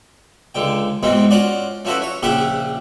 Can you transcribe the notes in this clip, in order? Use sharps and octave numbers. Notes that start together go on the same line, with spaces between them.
C#2 D3 G5
G#2 B2 E3 G#3 C4
C#4 F4 F#4 D5
F3 C#4 E4 F#4 A4 B4
C#5
A#1 C#3 C#4 G4 E5 F#5